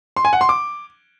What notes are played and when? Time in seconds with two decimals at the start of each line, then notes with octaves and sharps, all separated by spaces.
0.16 C6
0.25 G#5
0.33 F#5
0.41 C6
0.49 D6